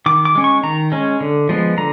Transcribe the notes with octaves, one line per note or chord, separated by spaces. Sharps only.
D#3 D6
D6
G#3 C#4
C#6
D#3 A#5
G#3 C#4
D3
F3 G#3 B3
D3 A#5